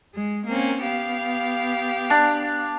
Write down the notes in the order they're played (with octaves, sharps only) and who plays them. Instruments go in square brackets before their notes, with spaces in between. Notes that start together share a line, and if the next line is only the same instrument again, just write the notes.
[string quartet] G#3
A#3 C4 C#4
B3 G4 F5
[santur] D4